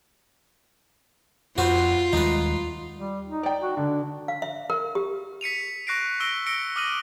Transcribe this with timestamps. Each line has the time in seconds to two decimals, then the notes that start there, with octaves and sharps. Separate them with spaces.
1.58 F2 F4 F#4 B4 C5
2.13 D#2 G3 G#3 D#4 B4
2.96 G3
3.28 D#4
3.43 D5 G5
3.63 F#4
3.77 D3 D4
4.28 F5
4.42 E5
4.70 A#4
4.95 G4
5.41 B6 C#7 D#7 F7
5.87 C#6 F#6 A#6 C7 D7
6.20 C#6 E6 A#6 D7 G7
6.46 E6 A#6 C#7 D7 G7
6.76 D6 D#6 F6 A#6 D#7 F#7